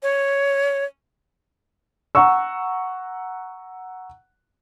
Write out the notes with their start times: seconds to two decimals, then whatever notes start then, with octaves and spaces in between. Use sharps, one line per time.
0.03 C#5
2.15 F#5 A#5 C#6 E6